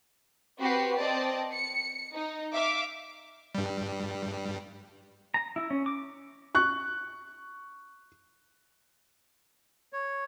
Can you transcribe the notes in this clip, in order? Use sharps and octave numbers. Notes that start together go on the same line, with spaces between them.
C4 F#4 G4 B4 C7
C4 D5 D#5 A5
C#7
D#4
E5 F5 D6
G2 G3
A#5
E4
C#4
D6
C#6 F#6
C#5